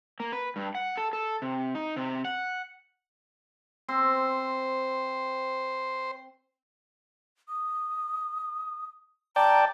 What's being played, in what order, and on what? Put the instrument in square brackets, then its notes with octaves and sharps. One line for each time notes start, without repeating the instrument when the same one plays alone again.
[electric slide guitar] A#3
B4
G2
F#5
A4
A4
C3
D#4
C3
F#5
[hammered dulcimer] C4 [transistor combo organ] C5
[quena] D#6
[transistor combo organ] D5 G5 A5 [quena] A#5